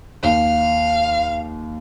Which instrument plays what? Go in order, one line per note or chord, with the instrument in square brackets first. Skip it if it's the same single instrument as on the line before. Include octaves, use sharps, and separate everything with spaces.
[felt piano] D#2 [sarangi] F5